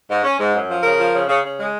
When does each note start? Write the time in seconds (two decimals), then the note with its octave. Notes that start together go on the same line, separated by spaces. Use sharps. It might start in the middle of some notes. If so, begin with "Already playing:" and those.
0.09 G#2
0.24 C#4
0.39 G#2
0.53 F#2
0.69 F3
0.83 C#3 A#4
0.99 F3
1.13 C#3
1.28 C#3
1.44 C#3
1.59 G#3